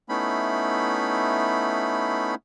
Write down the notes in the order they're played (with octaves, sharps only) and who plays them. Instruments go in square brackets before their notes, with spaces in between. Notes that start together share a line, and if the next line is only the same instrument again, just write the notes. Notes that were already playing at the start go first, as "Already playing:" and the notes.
[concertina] A3 B3 C#4 D#4 E4 B5